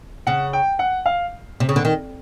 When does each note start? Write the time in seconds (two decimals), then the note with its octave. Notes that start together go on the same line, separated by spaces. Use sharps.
0.27 C#3 F#5
0.53 G5
0.79 F#5
1.06 F5
1.60 C3
1.69 C#3
1.76 D3
1.85 D#3